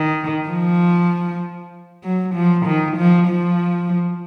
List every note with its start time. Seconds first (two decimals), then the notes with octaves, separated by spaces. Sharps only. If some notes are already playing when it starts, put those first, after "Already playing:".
Already playing: D#3
0.48 F3
2.04 F#3
2.35 F3
2.66 D#3
2.97 F3
3.28 F3